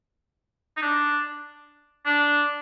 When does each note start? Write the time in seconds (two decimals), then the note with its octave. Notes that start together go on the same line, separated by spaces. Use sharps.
0.77 D#4
0.82 D4
2.06 D4